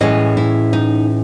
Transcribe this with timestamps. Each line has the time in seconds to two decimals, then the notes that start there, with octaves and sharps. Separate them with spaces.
0.01 A2 E3 G#3 C#4 D#5
0.37 E4
0.73 D#4